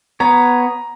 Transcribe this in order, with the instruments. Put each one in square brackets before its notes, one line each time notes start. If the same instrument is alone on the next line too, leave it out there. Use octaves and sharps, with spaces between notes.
[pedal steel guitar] B3 C#5 [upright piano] A#5